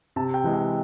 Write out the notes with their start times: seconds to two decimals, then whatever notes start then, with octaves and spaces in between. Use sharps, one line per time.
0.16 C3 A5
0.34 G5
0.44 E3 G#3
0.54 G5